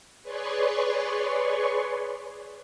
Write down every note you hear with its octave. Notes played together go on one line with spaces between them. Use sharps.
G#4 B4 C#5 D5 C6 C#6